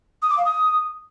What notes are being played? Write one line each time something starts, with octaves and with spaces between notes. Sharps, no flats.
D#6
D6
F5
D#6